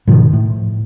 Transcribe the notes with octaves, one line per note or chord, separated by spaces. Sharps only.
G#2 B2 D#3 F3
A2